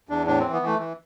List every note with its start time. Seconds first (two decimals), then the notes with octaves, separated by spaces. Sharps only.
0.09 E2 D4
0.27 A2 D4
0.40 E3 C4
0.53 B3
0.62 E3 A3
0.79 E3